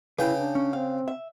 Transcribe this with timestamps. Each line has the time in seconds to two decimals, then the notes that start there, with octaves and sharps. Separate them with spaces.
0.19 C#3 E4 B4 G5
0.38 D4
0.55 C#4
0.73 C4 F5
1.08 E5